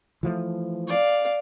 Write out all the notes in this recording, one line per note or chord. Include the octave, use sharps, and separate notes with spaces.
E3 F3 A3
D5 F5